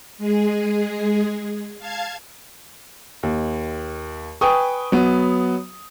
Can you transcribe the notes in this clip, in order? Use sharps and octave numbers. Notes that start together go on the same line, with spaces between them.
G#3 G#4
F5 A5 G#6
D#2
B4 G5 G#5 C#6 D#6
F#3 B3